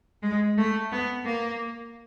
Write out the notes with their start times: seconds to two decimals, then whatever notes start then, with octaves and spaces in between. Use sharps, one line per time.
0.23 G#3
0.57 A3
0.91 B3
1.25 A#3